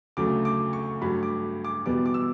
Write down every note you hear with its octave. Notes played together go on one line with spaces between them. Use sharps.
D2 C#3 F#3 A3 D6
D6
C#6
G2 F#3 A3 B5
D6
D6
E2 B2 G3 B3 D6
D6
E6